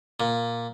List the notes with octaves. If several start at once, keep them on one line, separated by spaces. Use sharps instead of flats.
A#2